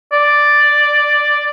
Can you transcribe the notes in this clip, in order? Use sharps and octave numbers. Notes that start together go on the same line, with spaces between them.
D5